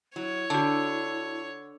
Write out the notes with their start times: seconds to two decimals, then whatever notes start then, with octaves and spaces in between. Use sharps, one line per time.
0.16 F#3 E4 C#5
0.50 D3 F#4 A5